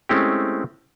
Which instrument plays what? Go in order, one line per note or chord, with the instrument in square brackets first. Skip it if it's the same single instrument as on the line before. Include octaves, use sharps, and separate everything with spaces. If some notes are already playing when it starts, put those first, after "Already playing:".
[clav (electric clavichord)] G#3 A3 C4 C#4 E4 G4